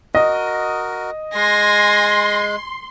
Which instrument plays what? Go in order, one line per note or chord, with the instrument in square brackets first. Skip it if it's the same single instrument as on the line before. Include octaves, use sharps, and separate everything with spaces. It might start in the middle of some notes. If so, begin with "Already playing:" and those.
[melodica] F#4 A#4 [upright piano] D#5
[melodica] G#3 [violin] G#5 A#6 [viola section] C6